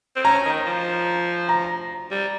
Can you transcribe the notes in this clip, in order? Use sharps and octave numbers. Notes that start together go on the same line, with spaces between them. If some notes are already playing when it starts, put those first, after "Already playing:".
C4
C#4 A#5
D#3
F3
A#5
G3